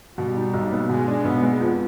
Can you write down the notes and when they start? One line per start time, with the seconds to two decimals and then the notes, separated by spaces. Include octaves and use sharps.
0.18 B2 G3
0.37 D#4
0.53 B1
0.72 B3
0.89 B2 G#3
1.08 D4
1.25 B1 B3
1.42 G#3
1.61 F2